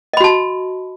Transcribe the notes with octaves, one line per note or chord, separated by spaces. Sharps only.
F#4 D#5 A5 B5